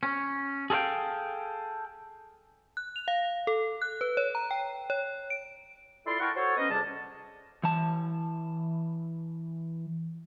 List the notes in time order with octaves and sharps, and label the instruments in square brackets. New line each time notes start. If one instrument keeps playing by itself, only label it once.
[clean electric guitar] C#4
G#4 A4 C#5 F5 G5
[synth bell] F#6
F7
F5
A4
F#6
B4
C#5
A#5
G5
C#5
D7
[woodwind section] E4 F4 A4 D5 C6
E4 A#4 F#5 G5 A5 C#6
F#4 A4 C5 C#5
B3 C#4 C5 D#5
F2 C3 G3 G#4 A5
[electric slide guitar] E3 A5